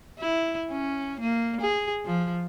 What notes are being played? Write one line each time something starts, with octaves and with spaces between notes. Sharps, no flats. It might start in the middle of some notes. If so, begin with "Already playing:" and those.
E4
C#4
A#3
G#4
F3